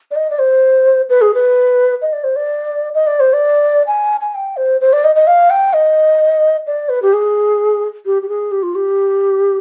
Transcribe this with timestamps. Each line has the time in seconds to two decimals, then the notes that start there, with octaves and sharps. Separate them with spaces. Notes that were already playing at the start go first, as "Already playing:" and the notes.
0.11 D5
0.15 D#5
0.30 D5
0.39 C5
1.09 B4
1.21 G#4
1.34 B4
2.01 D#5
2.12 D5
2.24 C5
2.36 D5
2.94 D#5
3.07 D5
3.20 C5
3.33 D5
3.87 G#5
4.20 G#5
4.34 G5
4.56 C5
4.81 C5
4.93 D5
5.04 D#5
5.15 D#5
5.27 F5
5.50 G5
5.73 D#5
6.67 D5
6.89 B4
7.02 G4
7.13 G#4
8.05 G4
8.22 G4
8.28 G#4
8.51 G4
8.62 F4
8.75 G4